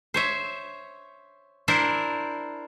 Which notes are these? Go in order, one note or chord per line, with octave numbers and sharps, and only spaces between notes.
C5 C#5 E5
D4 E4 A#4 C5